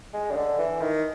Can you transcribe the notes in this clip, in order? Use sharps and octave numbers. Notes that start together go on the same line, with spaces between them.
G#3
C#3
D3
E3
D#3